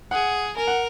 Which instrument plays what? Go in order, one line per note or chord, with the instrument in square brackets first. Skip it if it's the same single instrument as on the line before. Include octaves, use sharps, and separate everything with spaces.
[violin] G#4 [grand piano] F#5
[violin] A#4 [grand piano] G#5
[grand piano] F#5